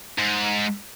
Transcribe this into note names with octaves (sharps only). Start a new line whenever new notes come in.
G#2